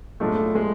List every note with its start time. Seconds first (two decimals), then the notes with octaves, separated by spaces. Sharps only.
0.20 B1 A2 G#3 A3 D4 F4
0.55 G#3